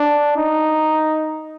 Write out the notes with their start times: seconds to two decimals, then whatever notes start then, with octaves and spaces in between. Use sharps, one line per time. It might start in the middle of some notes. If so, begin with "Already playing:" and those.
Already playing: D4
0.37 D#4